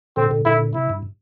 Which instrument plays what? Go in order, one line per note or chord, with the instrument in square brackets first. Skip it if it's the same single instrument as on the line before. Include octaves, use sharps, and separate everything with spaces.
[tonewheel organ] A#2 D3 [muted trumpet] C4
[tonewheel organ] A#2 D3
[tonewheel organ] A#2 D3 [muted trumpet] E4
[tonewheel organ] C3 [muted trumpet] E4
[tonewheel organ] G2